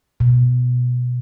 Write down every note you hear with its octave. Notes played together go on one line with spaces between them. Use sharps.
B2